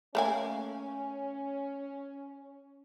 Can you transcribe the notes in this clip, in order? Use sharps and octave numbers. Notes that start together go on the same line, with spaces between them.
A3 A#3 C#4 G#5